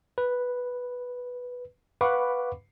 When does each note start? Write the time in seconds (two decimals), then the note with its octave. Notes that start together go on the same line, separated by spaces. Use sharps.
0.18 B4
2.01 B4 F5 F#5 B5 C#6 D6